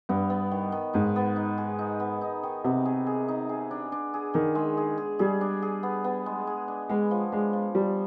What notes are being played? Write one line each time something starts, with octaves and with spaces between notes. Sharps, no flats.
G2 B3
B3
D#3
D#3
G#2 D#4
B3
D#4
G#4
D#4
B3
D#4
D#3
C3 B3
G#4
G#4
D#4
G#4
D4
D4
G#4
D#3 G#4
G#3
G#4
G#4
G3 G#4
D4
G#4
B3
B3
G#3
G#4
D4
G#3 B3
F3
G#3 D4
F3
F3 G3